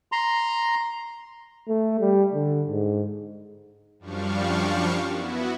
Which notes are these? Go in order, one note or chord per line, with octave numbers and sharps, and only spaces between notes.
A#5 C6
A3
G3
D3
G#2
F#2 F3 G3 D4 F5 C#6
B3 E4 F#4